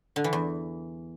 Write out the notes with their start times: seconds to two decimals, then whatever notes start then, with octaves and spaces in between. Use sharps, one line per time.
0.16 D3
0.24 E3
0.33 E2